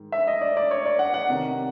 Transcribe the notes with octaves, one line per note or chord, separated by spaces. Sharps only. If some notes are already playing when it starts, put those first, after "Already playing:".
Already playing: G#2 D#3
E5
D#5
D5
D5
C#5
D5
F#5
F#5
C2 C3 D#3